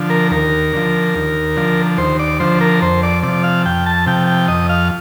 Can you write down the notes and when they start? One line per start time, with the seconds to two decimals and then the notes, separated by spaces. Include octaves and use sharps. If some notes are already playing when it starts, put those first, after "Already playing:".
Already playing: D3 F3
0.10 A#4
0.31 D#2 A#4
0.73 D3 F3
1.15 D#2
1.56 D3 F3
1.98 D#2 C5
2.19 D5
2.40 D3 F3 C5
2.61 A#4
2.82 F2 C5
3.03 D5
3.23 C3 F3 D5
3.44 F5
3.66 F2 G5
3.86 A5
4.06 C3 F3 G5
4.27 G5
4.48 F2 D#5
4.69 F5